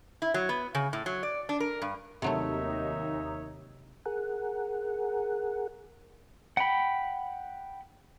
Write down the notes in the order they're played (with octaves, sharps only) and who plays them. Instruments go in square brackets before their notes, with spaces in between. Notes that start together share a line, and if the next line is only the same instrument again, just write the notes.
[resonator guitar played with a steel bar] E4
F#3
B3
C#3
A2
F#3
D5
D4
A#4
G2
[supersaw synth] D#2 D#4 [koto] C3 F#3 A3 [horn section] A#4 C#5 E5
[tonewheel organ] G#4 A#4 F#5
[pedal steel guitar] F#5 G5 B5